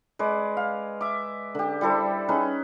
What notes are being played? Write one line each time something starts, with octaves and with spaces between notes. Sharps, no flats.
G#3 B4 D5
F5
E5 D6
D3 G4
G3 E4 A4 C5
C#4 D#4 G#4 B4